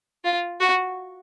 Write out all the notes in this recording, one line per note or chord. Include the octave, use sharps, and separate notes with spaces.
F4
F#4